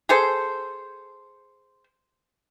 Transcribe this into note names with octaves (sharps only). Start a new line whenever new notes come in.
G#4 A4 C5